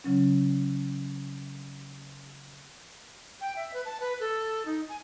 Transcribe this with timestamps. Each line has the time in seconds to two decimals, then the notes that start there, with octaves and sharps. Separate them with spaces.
0.04 C#3 F#3 C#4
3.41 G5
3.56 E5
3.73 B4
3.85 A5
4.00 B4
4.20 A4
4.65 D#4
4.89 G#5